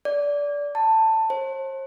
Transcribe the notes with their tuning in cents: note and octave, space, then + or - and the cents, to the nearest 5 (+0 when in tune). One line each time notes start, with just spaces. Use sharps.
D5 -20
A5 +15
C5 +40